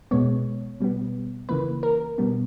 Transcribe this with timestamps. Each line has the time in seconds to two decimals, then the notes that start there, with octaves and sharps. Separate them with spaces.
0.11 B2 G#3 B3 C#5
0.80 B2 G3 B3
1.49 C#3 E3 A#3 B4
1.83 A#4
2.18 B2 G3 B3